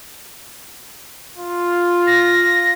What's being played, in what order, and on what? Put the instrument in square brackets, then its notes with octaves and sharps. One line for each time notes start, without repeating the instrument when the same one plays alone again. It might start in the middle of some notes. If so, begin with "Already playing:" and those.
[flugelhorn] F4
[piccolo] A#6